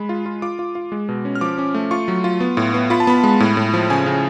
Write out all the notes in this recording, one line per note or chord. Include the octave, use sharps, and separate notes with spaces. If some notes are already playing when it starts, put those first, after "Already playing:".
Already playing: G#3 B5
F4
F4
F4 D6
F4
F4
G#3
B2
C#4
F6
F3 D6
C#4
A3
F4 C#6
F#3
F4
B3
A2
B3
F4 B5
A5
B3 B5
G#3
A2
A2
F3
C#3 G#5
C#3